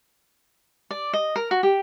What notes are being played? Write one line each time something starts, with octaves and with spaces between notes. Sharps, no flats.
D5
D#5
A#4
F#4
G4